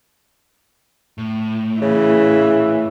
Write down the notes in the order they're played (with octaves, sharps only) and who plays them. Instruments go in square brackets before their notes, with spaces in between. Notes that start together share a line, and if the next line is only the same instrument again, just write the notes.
[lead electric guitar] A2
[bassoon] C#3 [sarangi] E3